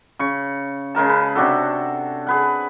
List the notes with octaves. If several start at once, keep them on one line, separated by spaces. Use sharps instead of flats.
C#3 C#6
C#3 G#3 A#4 A5
B4
C3 D4 F#4 A4
G#4 B4 F#5